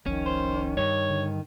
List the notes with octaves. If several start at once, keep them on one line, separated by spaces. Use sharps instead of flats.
F1 C2 D#3 F3 C#4
C5
G2 C#5
D3